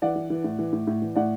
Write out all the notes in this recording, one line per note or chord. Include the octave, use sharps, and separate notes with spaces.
E3 D5 F#5
E3
E3
A2
E3
A2
A2
E3
A2 D5 F#5